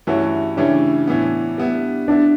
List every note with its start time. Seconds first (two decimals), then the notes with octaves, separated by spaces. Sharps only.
0.07 G2 E3 A3 C#4 E4 F#4
0.57 C#3 E3 A3 C#4 D4 G4
1.07 A2 E3 B3
1.58 G3 B3 E4
2.08 G3 B3 D4 E4